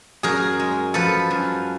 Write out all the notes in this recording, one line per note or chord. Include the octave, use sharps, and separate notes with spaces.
F#2 G#4 A#4
G#3
F3 A4 B4
F#2